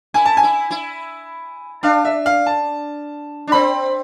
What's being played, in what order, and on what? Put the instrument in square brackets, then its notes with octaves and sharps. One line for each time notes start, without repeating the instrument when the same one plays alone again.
[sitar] E4 [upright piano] G#5
[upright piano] A5
G#5
[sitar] E4
E4
[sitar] D4 [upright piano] F5
[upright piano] E5
F5
A5
[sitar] D4
[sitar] C4 [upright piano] B5